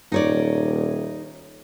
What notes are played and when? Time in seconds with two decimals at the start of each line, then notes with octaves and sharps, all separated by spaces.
0.12 D#1 D#4 C#5 D5